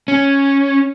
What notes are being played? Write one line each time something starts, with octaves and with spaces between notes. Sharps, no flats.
C#4